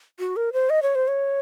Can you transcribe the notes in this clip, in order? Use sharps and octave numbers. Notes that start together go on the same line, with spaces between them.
F#4
A#4
C5
D#5
C#5
C5
C#5